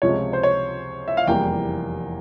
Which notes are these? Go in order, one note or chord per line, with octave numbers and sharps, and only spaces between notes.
C#2 C3 F3 G#3 C#5
C5
C#5
E5
F5
F1 E2 E3 G3 A#3 G5